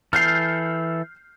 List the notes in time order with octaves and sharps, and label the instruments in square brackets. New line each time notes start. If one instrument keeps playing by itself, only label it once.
[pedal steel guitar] E3 A4 [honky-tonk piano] F6 G6 C7